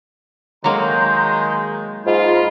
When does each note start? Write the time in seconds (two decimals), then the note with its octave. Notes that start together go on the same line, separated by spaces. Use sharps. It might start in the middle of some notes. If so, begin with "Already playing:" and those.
0.64 D#3 F#3 G#3 A#3 A#5 C6 G6
2.06 G#2 F4 A#5 B5